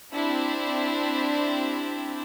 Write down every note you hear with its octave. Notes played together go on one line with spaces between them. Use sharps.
C4 D4 E4 G4